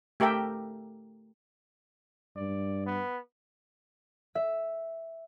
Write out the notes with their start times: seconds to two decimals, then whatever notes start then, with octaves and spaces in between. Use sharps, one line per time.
0.20 A3 G4 A#4 E5 G5
2.36 G2 D5
2.86 B3
4.35 E5